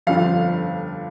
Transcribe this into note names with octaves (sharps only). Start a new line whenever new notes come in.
G1 F2 D3 F3 F5